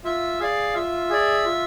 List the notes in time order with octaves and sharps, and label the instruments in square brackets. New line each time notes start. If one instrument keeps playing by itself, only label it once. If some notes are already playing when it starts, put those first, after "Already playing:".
[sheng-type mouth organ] F4 [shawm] E5
[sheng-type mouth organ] G#4 D5 [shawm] F5
[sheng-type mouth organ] F4 [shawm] E5
[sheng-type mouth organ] G#4 D5
F4